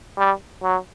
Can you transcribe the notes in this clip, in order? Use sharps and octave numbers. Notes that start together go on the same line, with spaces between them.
G3
F#3